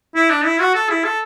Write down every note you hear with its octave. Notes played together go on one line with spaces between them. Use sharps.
E4
D4
E4
F#4
A4
E4
A4